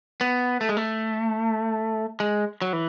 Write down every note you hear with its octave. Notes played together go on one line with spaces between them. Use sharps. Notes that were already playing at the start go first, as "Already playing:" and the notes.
B3
A3
G#3
A3
G#3
F#3
E3